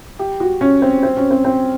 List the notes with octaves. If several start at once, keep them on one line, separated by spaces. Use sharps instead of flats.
G4
F#4
C#4
C4
C4
C#4
C4
C4